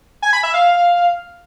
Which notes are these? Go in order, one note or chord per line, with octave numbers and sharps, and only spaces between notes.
G#5
B5
E5
F5